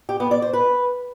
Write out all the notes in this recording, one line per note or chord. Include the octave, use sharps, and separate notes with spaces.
G4
B3
D5
C5
B4